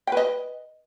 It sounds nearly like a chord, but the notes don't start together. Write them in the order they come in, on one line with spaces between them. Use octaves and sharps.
G5 B4 D#5